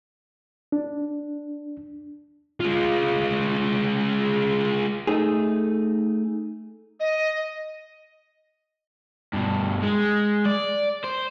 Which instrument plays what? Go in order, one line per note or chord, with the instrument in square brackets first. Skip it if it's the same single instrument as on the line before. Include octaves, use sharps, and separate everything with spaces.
[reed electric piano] D4
[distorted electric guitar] G#3 F4
[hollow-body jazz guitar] A3 D#4 G#4
[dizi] D#5
[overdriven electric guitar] G2 B2
G#3
D5
C5